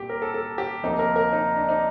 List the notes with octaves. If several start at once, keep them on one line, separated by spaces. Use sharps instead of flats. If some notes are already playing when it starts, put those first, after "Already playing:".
Already playing: C2 A#2 A3 G4
A#4
A4
A4
G4
D2 C3 F3 A#3 D#4
A#4
A#4
D#4
D4
D#4